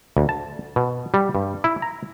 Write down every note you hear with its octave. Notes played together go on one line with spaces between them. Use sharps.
D2
A5
B2
G3
G2
E4
A#5